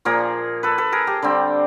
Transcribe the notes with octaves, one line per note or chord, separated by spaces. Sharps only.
A#2 F3 A#3 G#4 A#4
A4 B4
A4 B4
G#4 A#4
G4 A4
D3 G3 C4